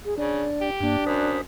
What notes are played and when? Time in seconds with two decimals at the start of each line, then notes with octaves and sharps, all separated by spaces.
0.05 G#4
0.18 C#3 D4 D5
0.61 G4
0.81 G2 A#3 D4
1.06 F#2 C5 D#6 B6